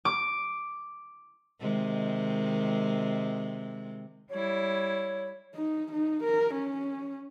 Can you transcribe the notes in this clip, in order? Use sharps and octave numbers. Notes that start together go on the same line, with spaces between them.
D6
C3 D#3 G#3
G3 E4 C#5
D#4
D#4
A#4
C#4